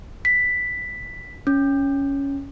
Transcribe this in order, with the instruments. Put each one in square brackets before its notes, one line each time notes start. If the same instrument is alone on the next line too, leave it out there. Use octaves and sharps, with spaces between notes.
[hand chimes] B6
C#4